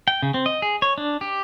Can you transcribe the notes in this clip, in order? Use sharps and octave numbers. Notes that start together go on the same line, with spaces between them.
G5
C#3
C4
D#5
G#4
C#5
D4
G4